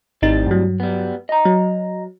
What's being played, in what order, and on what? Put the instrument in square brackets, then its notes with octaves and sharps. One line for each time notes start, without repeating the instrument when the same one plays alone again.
[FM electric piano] G#1 D#4 A6 [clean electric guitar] A2 G3 C4
[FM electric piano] G2 F#3
[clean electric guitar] G3 B3
D#5 A#5
[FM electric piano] F#3